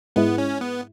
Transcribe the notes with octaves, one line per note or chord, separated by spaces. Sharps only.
G#2 G#3 B3 E4
C#4
B3